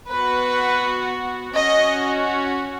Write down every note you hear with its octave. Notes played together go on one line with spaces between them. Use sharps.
B3 F#4 B4
C#4 F#4 D#5